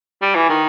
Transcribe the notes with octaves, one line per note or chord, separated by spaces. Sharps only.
G3
E3
D#3